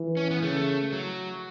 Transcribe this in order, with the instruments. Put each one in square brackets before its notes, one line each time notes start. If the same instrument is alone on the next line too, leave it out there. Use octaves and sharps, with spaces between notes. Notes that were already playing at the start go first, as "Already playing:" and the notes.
Already playing: [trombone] E3
[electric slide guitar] C#4
B3
[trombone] C#3 [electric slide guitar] A3
[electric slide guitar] F#3